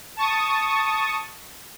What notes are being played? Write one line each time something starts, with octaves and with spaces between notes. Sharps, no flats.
A5 C#6 D#6